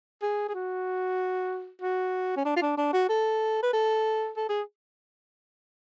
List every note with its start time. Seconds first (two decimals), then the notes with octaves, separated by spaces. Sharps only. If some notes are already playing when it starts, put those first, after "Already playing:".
0.22 G#4
0.49 G#4
0.54 F#4
1.82 F#4
2.37 C#4
2.45 D4
2.56 F4
2.62 D4
2.77 D4
2.93 F#4
3.09 A4
3.63 B4
3.73 A4
4.37 A4
4.49 G#4